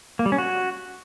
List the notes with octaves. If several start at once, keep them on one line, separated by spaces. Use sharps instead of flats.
A#3
G3
C#4
F#4